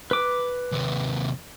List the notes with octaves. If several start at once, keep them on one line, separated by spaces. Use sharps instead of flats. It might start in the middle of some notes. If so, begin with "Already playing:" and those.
B4 D6
D#2 C3